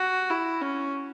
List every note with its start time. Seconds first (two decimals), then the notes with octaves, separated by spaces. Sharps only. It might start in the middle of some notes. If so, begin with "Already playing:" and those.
Already playing: F#4
0.30 E4
0.62 C#4